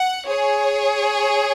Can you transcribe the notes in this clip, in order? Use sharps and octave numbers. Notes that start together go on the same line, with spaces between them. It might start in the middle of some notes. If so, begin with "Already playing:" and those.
Already playing: F#5
G#4 C#5